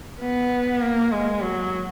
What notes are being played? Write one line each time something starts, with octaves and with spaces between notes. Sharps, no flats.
B3
A#3
G#3
F#3